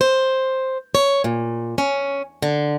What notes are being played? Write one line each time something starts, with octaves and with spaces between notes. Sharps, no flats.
C5
C#5
A#2
C#4
D3